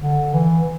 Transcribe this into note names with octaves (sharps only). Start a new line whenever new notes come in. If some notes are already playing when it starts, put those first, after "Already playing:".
D3
E3